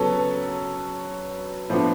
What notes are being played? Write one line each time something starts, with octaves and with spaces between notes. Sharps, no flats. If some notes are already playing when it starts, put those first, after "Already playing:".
Already playing: C#3 F#3 B3 A4 B4 C#5
A2 F3 B3 D4